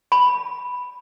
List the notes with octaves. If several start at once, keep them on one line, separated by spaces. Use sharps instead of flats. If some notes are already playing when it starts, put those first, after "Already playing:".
B5